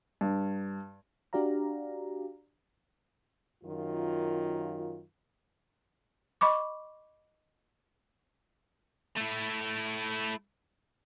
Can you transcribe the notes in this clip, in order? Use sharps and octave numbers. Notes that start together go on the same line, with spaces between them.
G2
D4 F#4 G4 D5 F5 A#5
F#2 D#3 F4
D#5 B5 C#6 D6
A3 E4